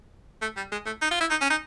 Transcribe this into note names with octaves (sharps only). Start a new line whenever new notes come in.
A3
G3
G#3
A3
D#4
F4
E4
D#4
C#4
D#4